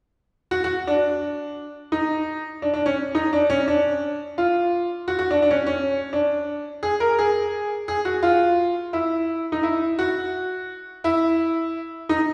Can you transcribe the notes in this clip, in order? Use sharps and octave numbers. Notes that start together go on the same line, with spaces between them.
F#4
F#4
D4
D#4
D4
D4
C#4
D#4
D4
C#4
D4
F4
F#4
F#4
D4
D4
C#4
C#4
D4
G#4
A#4
G#4
G#4
F#4
F4
E4
D#4
E4
F#4
E4
D#4